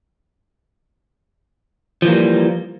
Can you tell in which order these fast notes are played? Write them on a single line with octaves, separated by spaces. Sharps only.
F3 E3 A#3 G3